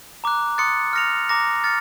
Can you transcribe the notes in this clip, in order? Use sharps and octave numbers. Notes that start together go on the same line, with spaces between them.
A#5 D6 F#6
C6 D#6 F#6 A6 C#7
F6 A#6 C#7 F7
A#5 D6 F#6 A#6 C#7
F6 A6 C#7